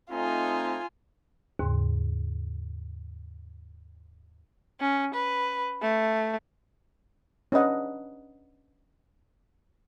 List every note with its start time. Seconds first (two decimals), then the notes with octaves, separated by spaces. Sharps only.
0.11 A3 C4 D#4 F4 G#5
1.59 D#2 G#2 C#3 C6
4.81 C#4
5.14 B4
5.82 A3
7.52 C#4 D4 B4 D#5 F#5